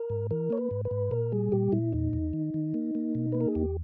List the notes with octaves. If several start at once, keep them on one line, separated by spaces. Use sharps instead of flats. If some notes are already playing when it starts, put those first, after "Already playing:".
Already playing: A#4
G#2
E3 A#4
A#3 C#5
B4
G#2
B4
G#2
A#2 A#4
G3 G#4
A#2 G4
A#2 E4
E2 D#4
E2
D#3
D#3
A#3
A#3
B2
A#3 B4
A#4
G#4
E2 G4